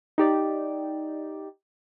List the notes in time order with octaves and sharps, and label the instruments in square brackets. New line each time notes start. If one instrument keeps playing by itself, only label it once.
[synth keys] D#4 G4 D5